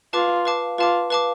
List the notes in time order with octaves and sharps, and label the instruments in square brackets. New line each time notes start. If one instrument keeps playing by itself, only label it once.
[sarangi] F4 [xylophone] B4 F5 A5 D6
[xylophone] B4 F5 A5 D6
[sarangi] F4 [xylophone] B4 F5 A5 D6
[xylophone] B4 F5 A5 D6